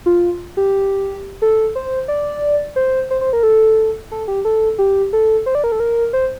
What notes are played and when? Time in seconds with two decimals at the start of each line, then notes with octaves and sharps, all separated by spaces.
0.06 F4
0.57 G4
1.42 A4
1.75 C5
2.08 D5
2.76 C5
3.10 C5
3.21 C5
3.33 A#4
3.43 A4
4.12 A4
4.28 G4
4.45 A4
4.79 G4
5.13 A4
5.46 C5
5.55 D5
5.64 A#4
5.72 A4
5.80 A#4
6.13 C5